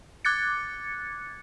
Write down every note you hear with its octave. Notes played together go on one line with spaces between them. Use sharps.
D6 F#6 G#6 A6 C#7